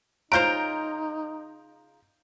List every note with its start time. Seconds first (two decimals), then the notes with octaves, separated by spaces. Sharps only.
0.32 C#3 D#4 F4 C5 A#5 G6 D7